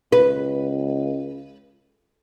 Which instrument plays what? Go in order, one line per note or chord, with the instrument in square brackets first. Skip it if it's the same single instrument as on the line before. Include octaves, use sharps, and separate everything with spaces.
[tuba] C#2 [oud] B4